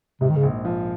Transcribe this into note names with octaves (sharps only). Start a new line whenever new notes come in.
G#2 C3
D#3
C#3
A#1
F3